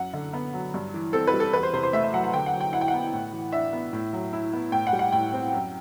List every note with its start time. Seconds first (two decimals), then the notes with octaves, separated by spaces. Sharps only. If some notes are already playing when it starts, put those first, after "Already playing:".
Already playing: F#2 F#5
0.14 D3
0.33 B3
0.54 F#3
0.74 G2
0.94 E3
1.13 C4 A4
1.27 B4
1.34 G3
1.40 A4
1.53 E2 B4
1.63 C5
1.73 C3 C5
1.83 C5
1.93 A3 E5
2.03 E5
2.13 F#3 F#5
2.24 F#5
2.33 D3 G5
2.46 F#5
2.53 F#3
2.60 G5
2.73 E4 F#5
2.81 G5
2.88 F#5
2.94 B3
3.13 A2
3.33 E3
3.53 D4 E5
3.73 B3
3.93 A2
4.13 F#3
4.33 E4
4.53 B3
4.72 A2 G5
4.87 F#5
4.93 G3
4.99 F#5
5.12 A2 G5
5.33 C4
5.53 F#2